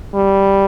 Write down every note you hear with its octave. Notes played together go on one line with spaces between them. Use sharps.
G3